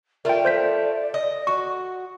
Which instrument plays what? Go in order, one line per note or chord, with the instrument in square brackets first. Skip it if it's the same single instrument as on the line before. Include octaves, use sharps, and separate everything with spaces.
[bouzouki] A3 F4 [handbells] A#4 G5 [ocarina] D5
[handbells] C5 G6 B6
[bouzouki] D#5
[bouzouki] F#4 [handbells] C#6